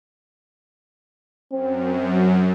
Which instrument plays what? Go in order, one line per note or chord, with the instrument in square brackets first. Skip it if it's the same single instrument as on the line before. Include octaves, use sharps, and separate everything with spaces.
[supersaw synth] F#2 [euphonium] C4